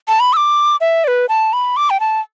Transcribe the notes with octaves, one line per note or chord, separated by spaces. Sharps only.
A5
B5
E6
D6
E5
D5
B4
A5
B5
D6
G5
A5